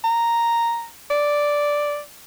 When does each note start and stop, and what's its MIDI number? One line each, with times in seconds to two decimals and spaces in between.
0.04 0.86 82
1.10 2.00 74